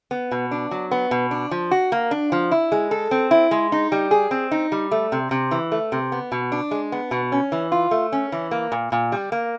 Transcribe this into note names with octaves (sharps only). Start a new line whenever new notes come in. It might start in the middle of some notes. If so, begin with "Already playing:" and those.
B3
B2
D4
F#3
B3
B2
D4
F3
F#4
A#3
D4
F3
E4
G#3
A4
C4
E4
G#3
D#4
G3
G#4
C4
D#4
G3
A3
C3
C3
E3
A3
C3
B3
B2
D4
G#3
B3
B2
C#4
E3
F4
A3
C#4
E3
A#3
A#2
A#2
G3
A#3